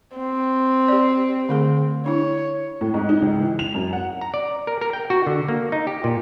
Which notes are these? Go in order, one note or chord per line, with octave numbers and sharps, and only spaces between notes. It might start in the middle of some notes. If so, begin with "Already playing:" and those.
C4
G4 D5
D3 A3 G#4
D4 E4 C#5
A2
G#2
D#4
C#2
E3
F7
F#2
F#5
A#5
D5
A#4
A#4
G5
F#4
D3
A#3
D#4
G4
A#2